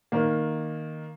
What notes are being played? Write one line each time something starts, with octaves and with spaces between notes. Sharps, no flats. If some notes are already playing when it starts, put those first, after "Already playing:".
D#3 A#3